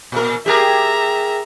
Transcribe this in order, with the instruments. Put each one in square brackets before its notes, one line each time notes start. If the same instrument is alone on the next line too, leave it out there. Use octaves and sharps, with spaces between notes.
[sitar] A#2 A#4
[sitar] G4 G#4 A#4 [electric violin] E5 A#5